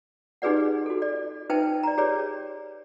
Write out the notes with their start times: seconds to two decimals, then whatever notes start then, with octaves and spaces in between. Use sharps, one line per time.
0.42 D#4 G4 G#4 B4 D5 F#5
0.86 F#4 A4
1.02 D5
1.50 D#4 B4 C5 E5 G5 A5
1.83 D5 A#5
1.98 G4 G#4 B4 C#5 D5